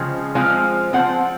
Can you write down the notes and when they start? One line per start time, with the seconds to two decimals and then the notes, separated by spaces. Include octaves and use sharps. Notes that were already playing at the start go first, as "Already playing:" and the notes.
Already playing: C#3 F3 G#3 C4
0.35 F3 G#3 C4 F5
0.93 G#3 C4 F#5
0.98 F3